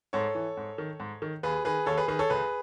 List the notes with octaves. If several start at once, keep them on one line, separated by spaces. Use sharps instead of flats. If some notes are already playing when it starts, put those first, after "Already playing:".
G#2 A4 C#5
E3
G#2
D#3
G#2
D#3
D#2 G#4 B4
D#3 G#4 B4
D#2 A4 C#5
G#4 B4
D#3 G#4 B4
A4 C#5
C#2 G#4 B4